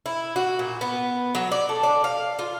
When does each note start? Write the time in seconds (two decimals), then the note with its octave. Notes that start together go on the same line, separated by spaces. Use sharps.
0.06 E4
0.36 F#4
0.59 A#2
0.81 B3
1.35 F#3
1.52 D5
1.69 A4
1.83 D5
2.04 F5
2.39 F4